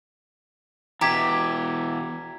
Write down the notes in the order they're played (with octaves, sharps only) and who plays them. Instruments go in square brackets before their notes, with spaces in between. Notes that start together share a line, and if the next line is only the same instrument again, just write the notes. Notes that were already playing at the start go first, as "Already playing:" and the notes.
[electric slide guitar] B2 E3 [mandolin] G4 [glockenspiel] A#5 G#6 B6